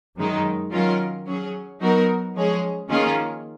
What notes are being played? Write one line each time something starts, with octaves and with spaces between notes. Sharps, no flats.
F#2 D#3 G#3 D#4
D#3 F#3 C#4 F4 A#4
F#3 C#4 G#4
F#3 B3 D#4 F#4 A#4
F3 G#3 C#4 G#4
D#3 A#3 C#4 F4 G#4